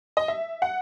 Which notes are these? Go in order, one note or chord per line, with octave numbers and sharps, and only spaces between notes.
D#5
E5
F#5